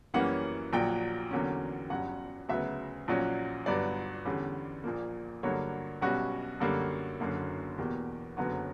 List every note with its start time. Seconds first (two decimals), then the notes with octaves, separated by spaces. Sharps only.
0.14 F#2 E3 G3 A#3 C#4 F#5
0.73 A#1 A#2 F#3 G5
1.31 E2 D3 F#3 A#3 C#4
1.90 G1 G2 F#3 C#4 F#5
2.49 D2 C#3 F#3 B3 E5
3.08 A#1 A#2 F#3 C#4
3.66 G1 G2 F#3 B3 D5
4.25 E2 D3 G3 C#4
4.84 A#1 A#2 A#3
5.43 G2 D3 F#3 A#3 C#5
6.01 B1 B2 G3 C#4 F#4
6.60 F#2 D3 G3 A#3
7.20 F#1 F#2 D3 A#3
7.78 E2 B2 A#3 G4
8.37 F#1 F#2 D3 F#3 B3